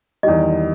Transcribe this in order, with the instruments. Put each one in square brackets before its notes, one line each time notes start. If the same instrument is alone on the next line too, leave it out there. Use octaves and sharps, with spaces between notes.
[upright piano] E2 D#3 G3 [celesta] D#5